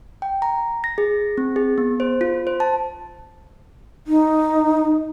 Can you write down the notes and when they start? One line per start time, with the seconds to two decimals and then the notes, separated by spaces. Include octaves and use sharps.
0.22 G5
0.42 A#5
0.84 A#6
0.98 G#4
1.38 C4
1.56 G#4
1.78 B3
2.00 C5
2.21 F4
2.47 C5
2.60 A5
4.07 D#4